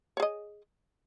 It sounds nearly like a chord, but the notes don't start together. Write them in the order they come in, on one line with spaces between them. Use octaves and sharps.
C#5 G#4 D#5